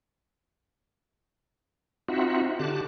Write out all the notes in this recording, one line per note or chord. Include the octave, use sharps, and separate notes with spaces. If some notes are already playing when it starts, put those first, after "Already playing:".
C4 D#4 F4 F#4 E5 F#5
D3 G4 A5 F#6